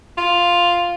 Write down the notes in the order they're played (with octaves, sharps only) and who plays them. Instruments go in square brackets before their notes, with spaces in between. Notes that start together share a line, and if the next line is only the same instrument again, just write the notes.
[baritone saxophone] F4